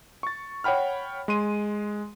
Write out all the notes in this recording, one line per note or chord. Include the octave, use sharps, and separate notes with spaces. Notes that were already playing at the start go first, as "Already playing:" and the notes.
C#6 A6
C#5 F#5 G5 B5 F6
G#3 C6 D#7